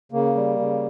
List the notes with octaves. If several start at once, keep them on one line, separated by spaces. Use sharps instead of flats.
C#3 A#3
G3
C#3